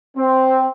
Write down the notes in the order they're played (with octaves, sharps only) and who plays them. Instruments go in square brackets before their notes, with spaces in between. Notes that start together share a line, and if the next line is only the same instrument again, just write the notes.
[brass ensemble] C4